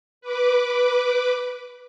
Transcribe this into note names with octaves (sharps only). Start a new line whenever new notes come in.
B4 D6